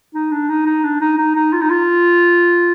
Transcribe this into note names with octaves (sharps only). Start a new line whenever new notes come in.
D#4
D4
D#4
D#4
D4
D#4
D#4
D#4
F4
D#4
F4